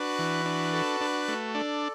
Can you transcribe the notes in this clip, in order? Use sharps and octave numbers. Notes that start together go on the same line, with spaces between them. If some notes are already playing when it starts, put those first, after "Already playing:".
Already playing: D4 F#4 B4
E3
D4
A4
D4
A3
D4 A4 D5